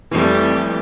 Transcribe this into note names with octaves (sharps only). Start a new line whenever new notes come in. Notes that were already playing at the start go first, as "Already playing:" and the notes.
F2 E3 G3 A3 G4